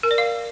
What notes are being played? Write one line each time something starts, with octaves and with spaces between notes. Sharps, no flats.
A#4
D5
F5